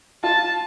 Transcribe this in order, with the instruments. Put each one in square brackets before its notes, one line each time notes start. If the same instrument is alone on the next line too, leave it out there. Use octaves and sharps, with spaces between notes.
[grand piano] F4 [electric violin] A5